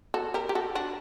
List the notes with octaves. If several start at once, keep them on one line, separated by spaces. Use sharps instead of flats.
F#4 A4
G4 A#4
G4
F#4 A4
D4 F#4